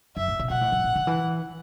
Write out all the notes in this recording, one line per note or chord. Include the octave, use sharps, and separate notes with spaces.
F#2 E5
A2
B2
B2 F#5
A2
F#2
A2
D3
E3